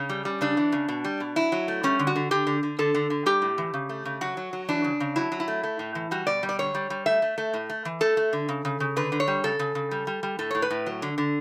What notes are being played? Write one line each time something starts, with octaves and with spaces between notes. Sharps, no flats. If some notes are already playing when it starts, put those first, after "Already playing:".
Already playing: C#3 C#4
G3
G3
C#3 D4
E3
C#3
B2
G3
B2
F#3 E4
F#3
A3
G3 C#4
D3
F#4
D3
D3 G4
D3
D3
D3 A4
D3
D3
G3 G4
A2
E3
C#3
A3
C#3
F#3 F#4
F#3
F#3
E3 D4
C#3
C#3
F#3 E4
F#3
E4
A3
A3
A2
E3
G3 F#4
B2 D5
G3
D5
D3 C#5
G3
G3
A3 E5
A3
A3
A2
A3
E3
A3 A4
A3
D3
C#3
C#3
C#3
D3 B4
D3
C#5
G3
C#3 A4
C#3
C#3
G3
G3
G3
A2 A4
A2 C#5
B4
A2
F#3
D3
D3